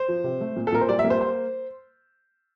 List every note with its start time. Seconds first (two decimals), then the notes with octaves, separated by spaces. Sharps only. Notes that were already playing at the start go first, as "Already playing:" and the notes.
Already playing: C5
0.08 F3
0.24 C3
0.41 A3
0.56 A#2
0.67 A4
0.72 A#2 A#4
0.81 C5
0.89 G3 D5
0.99 E5
1.04 A#3
1.10 C5
1.21 C5